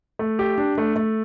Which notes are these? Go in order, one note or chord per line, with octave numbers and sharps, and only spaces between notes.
A3
G4
D4
A3
A3